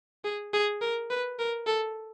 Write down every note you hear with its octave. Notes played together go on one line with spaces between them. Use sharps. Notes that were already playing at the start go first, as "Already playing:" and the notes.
G#4
G#4
A#4
B4
A#4
A4